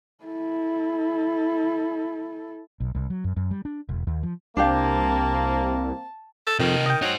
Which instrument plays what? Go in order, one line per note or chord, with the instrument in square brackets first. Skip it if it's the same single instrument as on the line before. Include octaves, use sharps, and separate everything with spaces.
[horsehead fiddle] E4 A4
[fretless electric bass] B1
C2
F#3
F#2
F#2
G3
D4
E1
D#2
F3
[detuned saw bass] C2 [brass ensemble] A#3 C4 [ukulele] D4 G4 F5 [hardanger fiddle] A5
[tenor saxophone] A4
[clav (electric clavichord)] F2 [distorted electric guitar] C3 D#5 [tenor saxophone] D#3
[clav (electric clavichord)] D#5 G5
[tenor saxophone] F#3 [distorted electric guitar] D#4 C5